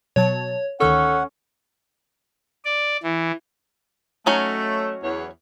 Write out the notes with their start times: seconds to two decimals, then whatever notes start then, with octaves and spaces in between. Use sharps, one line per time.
0.16 B2 F#3 C#5 A5
0.80 D2 D#3 C#4 A4 C#5 F#5
2.65 D5
3.03 E3
4.26 F#3 A3 C#4 D#4
5.03 E2 C#5